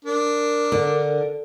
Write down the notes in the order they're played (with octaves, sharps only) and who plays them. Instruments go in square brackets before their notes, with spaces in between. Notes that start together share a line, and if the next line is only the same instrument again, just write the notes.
[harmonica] D4 [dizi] A#4
[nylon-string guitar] D3